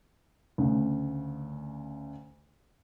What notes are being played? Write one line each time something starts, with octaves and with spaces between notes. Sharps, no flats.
D2 C#3